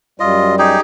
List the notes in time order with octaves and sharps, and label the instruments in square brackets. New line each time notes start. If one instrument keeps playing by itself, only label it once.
[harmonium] F#2 G3 [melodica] F4 D#5
[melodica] D#4 G4 G#4